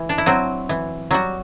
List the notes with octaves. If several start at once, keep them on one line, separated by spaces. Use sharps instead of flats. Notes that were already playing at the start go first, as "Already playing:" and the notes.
Already playing: E3
D4
E4
F#3 C4 F#4
E3
F#3 G3 F#4